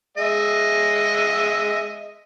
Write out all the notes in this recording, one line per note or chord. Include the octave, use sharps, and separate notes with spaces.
G#3 D#5 E5